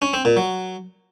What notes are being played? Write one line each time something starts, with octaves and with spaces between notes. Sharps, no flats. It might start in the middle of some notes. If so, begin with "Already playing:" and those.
C#4
C4
A#2
F#3